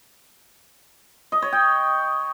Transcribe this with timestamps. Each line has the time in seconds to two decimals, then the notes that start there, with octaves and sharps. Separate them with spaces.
1.32 D#5
1.42 C#5
1.52 G5